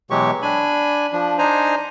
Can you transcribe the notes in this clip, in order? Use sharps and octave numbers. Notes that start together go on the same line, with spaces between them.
B2 E3 F#3 G#3 G4 C#6
D4 G#5 B5
F3 D4
D4 D#4 C5 G#5 A#5